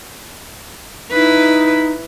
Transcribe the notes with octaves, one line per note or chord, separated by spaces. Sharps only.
D#4 E4 B4